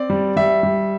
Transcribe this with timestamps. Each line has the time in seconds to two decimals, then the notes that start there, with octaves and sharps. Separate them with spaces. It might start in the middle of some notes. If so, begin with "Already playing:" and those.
Already playing: C4 D5
0.10 G3
0.37 G3 E5
0.63 G3